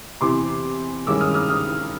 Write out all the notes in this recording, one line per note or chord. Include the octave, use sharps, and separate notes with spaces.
E2 C3 E3 C6 D6
G2 D#3 G#3 C#4 D6 E6
D#6 F6
D#6 F6
D#6 F6